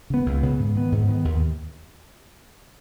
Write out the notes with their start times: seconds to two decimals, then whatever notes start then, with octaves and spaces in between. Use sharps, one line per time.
0.10 C#3 B3
0.26 C#2
0.43 C#3 B3
0.59 G#2
0.75 D#3 B3
0.92 G#2
1.08 D#3 B3
1.25 D#2